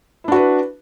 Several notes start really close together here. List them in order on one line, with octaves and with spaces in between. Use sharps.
E4 D4 F#4 B4